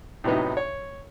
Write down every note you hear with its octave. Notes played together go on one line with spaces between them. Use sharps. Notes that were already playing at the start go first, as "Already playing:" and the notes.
A2 C3 F#3 B3 D#4
C#5